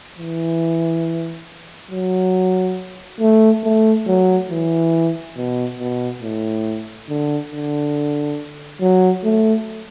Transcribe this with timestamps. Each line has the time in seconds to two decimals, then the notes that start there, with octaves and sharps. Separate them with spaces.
0.18 E3
1.91 F#3
3.20 A3
3.64 A3
4.07 F#3
4.50 E3
5.37 B2
5.79 B2
6.22 A2
7.09 D3
7.51 D3
8.81 F#3
9.24 A3